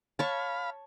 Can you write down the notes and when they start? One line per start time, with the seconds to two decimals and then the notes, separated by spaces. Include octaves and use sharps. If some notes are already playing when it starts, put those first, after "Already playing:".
0.19 C#5 F5 A5 B5